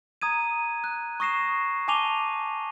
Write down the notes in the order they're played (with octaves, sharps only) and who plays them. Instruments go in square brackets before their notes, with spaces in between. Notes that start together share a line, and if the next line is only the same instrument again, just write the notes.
[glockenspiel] A#5 D#6 G#6 D#7
F#6
C#6 D#6 A#6 C7 E7
G#5 A5 D6 D#7 F7 G7